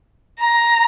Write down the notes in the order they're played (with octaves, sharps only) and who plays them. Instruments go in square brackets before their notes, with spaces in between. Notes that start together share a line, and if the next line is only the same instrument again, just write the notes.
[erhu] A#5